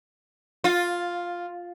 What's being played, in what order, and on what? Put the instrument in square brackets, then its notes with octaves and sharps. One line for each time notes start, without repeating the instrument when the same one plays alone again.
[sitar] F4